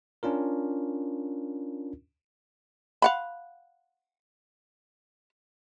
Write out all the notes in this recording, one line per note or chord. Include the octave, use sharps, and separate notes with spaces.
C#4 D4 F4 A#4
F5 F#5 B5